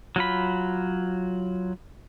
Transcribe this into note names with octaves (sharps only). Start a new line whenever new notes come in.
F#3 F4 B5